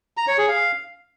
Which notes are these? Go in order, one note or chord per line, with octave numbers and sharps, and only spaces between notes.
A#5
C#5
G#4
F5